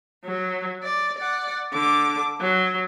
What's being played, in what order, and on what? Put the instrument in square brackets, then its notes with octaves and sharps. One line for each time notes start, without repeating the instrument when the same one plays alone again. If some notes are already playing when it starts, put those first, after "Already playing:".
[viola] F#3
D5
D5 F#5
D3 D6
F#3